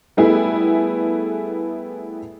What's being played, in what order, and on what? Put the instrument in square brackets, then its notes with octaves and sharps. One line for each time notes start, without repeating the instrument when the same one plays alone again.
[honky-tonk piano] G3 A3 B3 E4 G#4